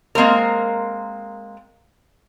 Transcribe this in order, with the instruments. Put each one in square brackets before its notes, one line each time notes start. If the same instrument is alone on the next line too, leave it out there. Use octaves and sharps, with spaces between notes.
[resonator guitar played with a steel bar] G#3 A#3 C4 A#4